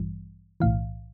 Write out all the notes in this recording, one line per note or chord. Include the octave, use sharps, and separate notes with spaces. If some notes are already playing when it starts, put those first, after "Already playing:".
Already playing: A1 G2 E3 G3
B1 A2 E3 F5